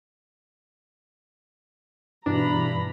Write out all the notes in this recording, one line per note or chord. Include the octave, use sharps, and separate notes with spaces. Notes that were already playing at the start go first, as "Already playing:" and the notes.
G2 B2 E3 D4 A#5 B5